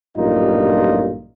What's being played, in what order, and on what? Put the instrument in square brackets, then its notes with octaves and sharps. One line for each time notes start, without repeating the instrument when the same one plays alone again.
[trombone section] A1 G2 A#2 F#3 D#4 F4